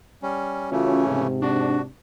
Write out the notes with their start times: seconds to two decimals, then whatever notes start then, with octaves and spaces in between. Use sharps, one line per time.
0.23 G3 C#4
0.72 C#3 E3 A3 C#4 F4 F#4
1.07 G#2 C3
1.42 D4 F#4